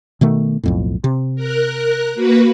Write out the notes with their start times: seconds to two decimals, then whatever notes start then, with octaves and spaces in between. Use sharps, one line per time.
0.21 B2 D#3 A3
0.63 B1 F2 A2
1.04 C3
1.35 A#4 F#6
2.15 A#3 F#4 B4